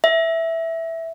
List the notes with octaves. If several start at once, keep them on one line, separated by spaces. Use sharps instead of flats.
E5